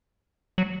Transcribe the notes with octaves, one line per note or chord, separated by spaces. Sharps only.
F#3